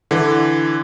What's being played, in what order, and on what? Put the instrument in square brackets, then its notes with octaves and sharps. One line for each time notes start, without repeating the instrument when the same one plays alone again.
[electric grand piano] D3 E3